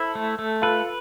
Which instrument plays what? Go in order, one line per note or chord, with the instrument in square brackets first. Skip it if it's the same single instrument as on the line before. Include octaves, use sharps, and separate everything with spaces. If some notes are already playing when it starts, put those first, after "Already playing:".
Already playing: [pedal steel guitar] E4 [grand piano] A4 C5
[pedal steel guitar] A3
A3
[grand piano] F4 A4 [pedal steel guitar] B4